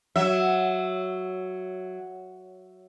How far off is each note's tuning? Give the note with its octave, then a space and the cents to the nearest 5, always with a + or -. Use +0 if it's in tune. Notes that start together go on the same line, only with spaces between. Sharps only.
F#3 +0 E5 +0